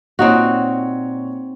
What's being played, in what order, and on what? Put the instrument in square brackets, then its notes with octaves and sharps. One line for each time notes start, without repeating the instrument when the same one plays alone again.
[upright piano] A#2 C#5 [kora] C4 D#4 F#4